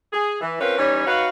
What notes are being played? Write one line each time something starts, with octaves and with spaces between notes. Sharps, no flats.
G#4
E3
C4 C#4 F4 A#4 B4
E3 G3 C#4 D#4 C#5
D#4 F#4 B4 C#5 F5